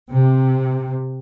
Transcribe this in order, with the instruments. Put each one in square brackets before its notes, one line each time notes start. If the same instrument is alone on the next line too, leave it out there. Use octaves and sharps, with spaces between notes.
[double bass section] C3